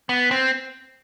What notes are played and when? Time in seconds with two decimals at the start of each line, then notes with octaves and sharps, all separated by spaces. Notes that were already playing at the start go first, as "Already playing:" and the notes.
0.09 B3
0.31 C4